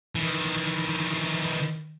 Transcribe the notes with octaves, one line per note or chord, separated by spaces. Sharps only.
D#3 E3